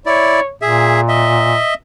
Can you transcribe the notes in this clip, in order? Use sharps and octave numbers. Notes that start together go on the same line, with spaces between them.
E4 C#5 D5
A#2 G#4 E5
D#5 E5